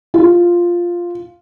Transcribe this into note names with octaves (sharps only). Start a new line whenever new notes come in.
F4